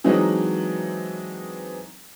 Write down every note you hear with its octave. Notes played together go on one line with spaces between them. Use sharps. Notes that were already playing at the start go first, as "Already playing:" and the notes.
E3 F#3 G#3 C4 D4 D#4